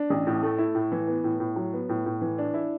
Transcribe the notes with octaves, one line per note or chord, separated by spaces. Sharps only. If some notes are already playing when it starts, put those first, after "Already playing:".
Already playing: D4
A1
A2
A3
E4
A2
E3
B3
A2
A2
F#3
B3
A2
A2
E3
D4
E4